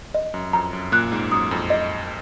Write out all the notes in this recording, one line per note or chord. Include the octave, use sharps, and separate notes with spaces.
D#5
F#2
F2 A#5
F#2
A#2 F#6
G#2
F#2 D#6
F2
D#5